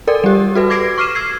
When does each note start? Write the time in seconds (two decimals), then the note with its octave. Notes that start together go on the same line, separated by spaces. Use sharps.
0.07 A4 A#4 D5
0.24 G3 G4
0.55 F#4 A4 B4
0.70 D6 G#6 A#6 C7 D7
0.98 C#6 D6 F6 C7 D#7 E7
1.15 E6 G#6 C7